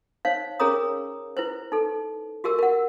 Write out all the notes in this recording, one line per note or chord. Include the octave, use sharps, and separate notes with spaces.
D#4 C5 C#5 F5
C#4 G#4 A#4 C#5 A#5 D#6
E4 B4 C5
D#4 A4
F#4 G4 A#4 E6
A#4 F#5